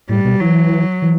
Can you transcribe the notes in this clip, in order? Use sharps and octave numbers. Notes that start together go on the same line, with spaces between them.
A2 G3
B2
E3 F#3
E3